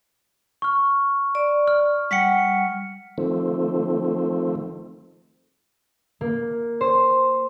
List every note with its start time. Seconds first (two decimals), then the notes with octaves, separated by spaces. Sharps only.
0.62 C#6 F6
1.35 D5
1.68 F6
2.11 G3 F#5 G5 B6 C#7
3.18 D#3 F3 A3 C4
6.21 A#3
6.81 C5